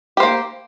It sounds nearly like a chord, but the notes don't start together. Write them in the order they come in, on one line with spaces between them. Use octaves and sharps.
G4 C5 A#3